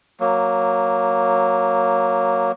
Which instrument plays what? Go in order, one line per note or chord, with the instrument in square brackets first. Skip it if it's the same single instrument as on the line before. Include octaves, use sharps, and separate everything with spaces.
[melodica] F#3 A#3